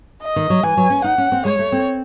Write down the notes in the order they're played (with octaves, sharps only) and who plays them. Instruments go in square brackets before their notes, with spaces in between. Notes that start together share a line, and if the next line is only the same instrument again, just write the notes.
[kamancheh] D#5
[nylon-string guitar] D#3
F#3
[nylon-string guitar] E3 [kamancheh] G#5
[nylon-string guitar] F#3
C#4
[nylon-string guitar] D#4 [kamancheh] F#5
[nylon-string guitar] C#4
C4
[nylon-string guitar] G#3 [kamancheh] C#5
[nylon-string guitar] A3
C4